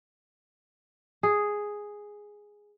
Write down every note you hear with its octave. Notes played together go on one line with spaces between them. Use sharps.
G#4